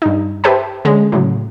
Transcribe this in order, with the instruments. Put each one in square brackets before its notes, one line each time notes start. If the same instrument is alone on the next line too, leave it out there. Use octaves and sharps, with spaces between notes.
[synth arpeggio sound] G2 D#4
G4 B4 C5 E5 G5 A5
D3 G#3 C#4
A2 C#3 F#3